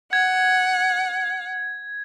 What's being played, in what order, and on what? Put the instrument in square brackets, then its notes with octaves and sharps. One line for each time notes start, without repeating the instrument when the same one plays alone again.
[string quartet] F#5 [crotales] G#6